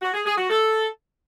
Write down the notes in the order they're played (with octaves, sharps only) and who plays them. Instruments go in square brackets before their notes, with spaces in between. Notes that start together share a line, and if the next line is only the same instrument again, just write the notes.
[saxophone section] F#4
G#4
G#4
F#4
A4